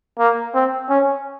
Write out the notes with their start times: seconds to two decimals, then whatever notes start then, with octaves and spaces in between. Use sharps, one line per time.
0.19 A#3
0.54 C4
0.89 C#4